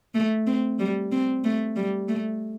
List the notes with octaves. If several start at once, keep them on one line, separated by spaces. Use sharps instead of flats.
A3
C4
G3
C4
A3
G3
A3